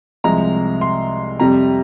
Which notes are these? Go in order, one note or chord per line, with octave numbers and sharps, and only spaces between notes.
C2 C3 F3 G#3 A#5
C6
F2 C3 G3 A#5